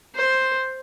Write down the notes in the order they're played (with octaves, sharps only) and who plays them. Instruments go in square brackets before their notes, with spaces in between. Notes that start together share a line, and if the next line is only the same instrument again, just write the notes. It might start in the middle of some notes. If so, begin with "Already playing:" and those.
[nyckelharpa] C5